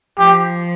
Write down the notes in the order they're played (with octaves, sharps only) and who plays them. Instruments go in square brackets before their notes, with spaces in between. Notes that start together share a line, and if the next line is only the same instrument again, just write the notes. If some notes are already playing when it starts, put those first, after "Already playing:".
[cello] F3 [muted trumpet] G4